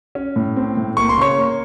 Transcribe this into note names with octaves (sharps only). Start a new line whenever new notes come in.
C#4
A2
C4
A2
A#3 C#6
C6
C#3 C#5 C#6
A#3